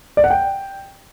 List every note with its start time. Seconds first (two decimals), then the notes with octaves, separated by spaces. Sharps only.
0.17 D5
0.24 F#5
0.30 G5